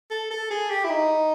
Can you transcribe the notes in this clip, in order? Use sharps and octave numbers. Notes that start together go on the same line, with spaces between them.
A4
A4
G#4
G4
E4
D#4